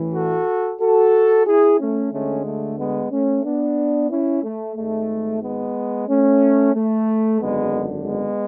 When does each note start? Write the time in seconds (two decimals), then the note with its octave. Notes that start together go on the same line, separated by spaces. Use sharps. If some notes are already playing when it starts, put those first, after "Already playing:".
Already playing: A1 A2 E3
0.14 F#4 A4
0.81 F#4 A4
1.47 E4 G#4
1.80 A3 C#4
2.12 D2 D3 G#3 A3 C#4
2.46 A3
2.79 G#3 B3
3.12 A3 C#4
3.45 B3 D4
4.10 C#4 E4
4.44 A3
4.77 G#1 G#2 G#3 A3
5.42 G#3 B3
6.08 A3 C#4
6.74 A3
7.41 G#1 F#2 D3 G#3 B3
8.06 G#3 B3